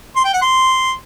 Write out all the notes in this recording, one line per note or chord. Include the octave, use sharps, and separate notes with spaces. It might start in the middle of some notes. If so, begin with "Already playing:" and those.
C6
G5
F#5
C6